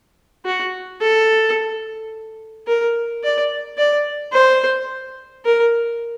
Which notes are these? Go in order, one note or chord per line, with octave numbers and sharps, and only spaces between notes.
F#4
A4
A#4
D5
D5
C5
A#4